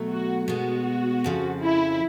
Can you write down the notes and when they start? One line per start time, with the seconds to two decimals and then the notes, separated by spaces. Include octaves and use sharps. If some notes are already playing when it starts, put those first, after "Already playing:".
Already playing: B2 F#3 A3
0.09 F#4
0.48 B2 G#3 B3 F#4
1.24 F2 C#3 F3
1.62 E4